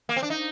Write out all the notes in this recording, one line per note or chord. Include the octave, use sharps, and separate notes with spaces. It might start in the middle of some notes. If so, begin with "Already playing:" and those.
A#3
C4
D4
D#4